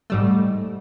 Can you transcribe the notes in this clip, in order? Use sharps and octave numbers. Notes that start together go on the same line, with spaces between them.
G#2 G3 A3